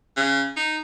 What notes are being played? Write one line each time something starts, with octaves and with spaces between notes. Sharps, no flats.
C#3
D#4